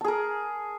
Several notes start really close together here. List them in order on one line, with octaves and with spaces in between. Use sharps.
A5 G#4 A#4